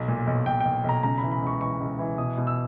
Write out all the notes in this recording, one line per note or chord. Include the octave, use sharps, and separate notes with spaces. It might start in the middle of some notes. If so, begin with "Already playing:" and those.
Already playing: B1
A#2
B1
B1 G5
B1 G5
B1 A#5
C#3 A#5
B5
E3
B5
C#2 C#6
E3 C#6
C#2
E3
B2 D#6
B2
E6